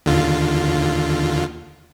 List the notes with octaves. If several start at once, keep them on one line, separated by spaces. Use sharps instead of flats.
D#2 D3 F4